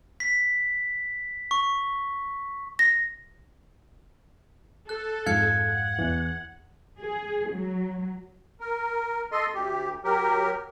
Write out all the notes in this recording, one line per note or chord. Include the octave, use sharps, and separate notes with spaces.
B6
C#6
A#6
A4 F#6
F2 G#2 F5 F#6 G#6 C#7
F#5
E2 E3
G#4
F#3
A#4
A4 D#5 C6
D2 G4
F#3 G4 A#4